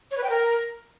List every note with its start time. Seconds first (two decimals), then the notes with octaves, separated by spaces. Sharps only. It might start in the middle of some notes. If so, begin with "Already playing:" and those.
0.11 C#5
0.17 B4
0.23 G5
0.30 A#4